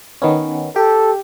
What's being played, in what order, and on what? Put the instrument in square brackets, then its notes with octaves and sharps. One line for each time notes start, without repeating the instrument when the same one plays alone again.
[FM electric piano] D#3 B3 C#4
[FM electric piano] G4 [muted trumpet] A4